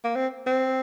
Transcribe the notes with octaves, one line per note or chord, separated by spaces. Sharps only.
A#3
C4
C4